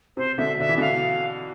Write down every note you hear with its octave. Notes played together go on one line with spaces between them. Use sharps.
C3 C5
B2 D3 E5
D3 E5
E3
B2 D3 F5